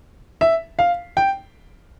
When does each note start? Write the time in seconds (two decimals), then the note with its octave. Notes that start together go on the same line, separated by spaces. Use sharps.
0.41 E5
0.79 F5
1.17 G5